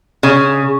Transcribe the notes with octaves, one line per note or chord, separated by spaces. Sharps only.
C#3